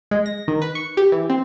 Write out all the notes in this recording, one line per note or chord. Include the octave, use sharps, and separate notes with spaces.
G#3
A#6
D#3
B4
C#6
G4
E3
C4